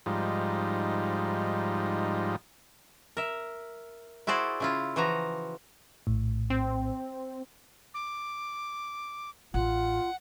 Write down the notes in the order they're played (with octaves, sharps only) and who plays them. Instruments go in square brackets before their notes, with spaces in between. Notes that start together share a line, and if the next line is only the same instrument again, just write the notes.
[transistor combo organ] G#2 F3 G3 D#4
[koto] A#4 E5
E4 F#4 G#4 C5 D5
C#3 E4 F4
E3 F3 F#4 A#5
[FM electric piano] A#1 A2
[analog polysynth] C4
[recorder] D6
[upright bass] A1 [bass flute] F4 [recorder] F#5